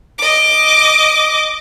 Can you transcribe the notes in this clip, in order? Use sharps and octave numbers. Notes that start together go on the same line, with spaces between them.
D#5 D6